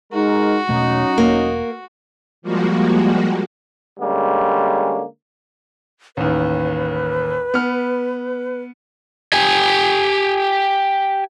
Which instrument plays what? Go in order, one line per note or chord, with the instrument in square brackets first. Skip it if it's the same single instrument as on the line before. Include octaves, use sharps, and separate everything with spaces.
[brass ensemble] G#3 D#4 A#4 [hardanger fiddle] F#4
[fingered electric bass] E1 B2 A3 [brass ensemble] F#3 C#4 D#4
[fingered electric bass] E1 [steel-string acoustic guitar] A#3
[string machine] F3 G3 G#3 A#3 F#4
[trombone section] D3 G3 G#3 A#3 C#4
[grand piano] A1 D#2 [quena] B4
[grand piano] B3 F6
[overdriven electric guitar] G4 G#5